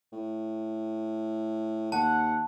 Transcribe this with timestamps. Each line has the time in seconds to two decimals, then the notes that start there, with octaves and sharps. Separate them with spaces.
0.12 A2
1.92 D#2 F#5 A5